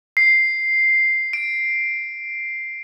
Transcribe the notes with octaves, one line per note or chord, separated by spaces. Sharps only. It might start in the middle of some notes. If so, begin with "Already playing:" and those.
C7
D7